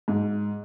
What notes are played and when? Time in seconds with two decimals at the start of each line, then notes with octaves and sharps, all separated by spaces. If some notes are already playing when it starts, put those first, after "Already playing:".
0.08 G#2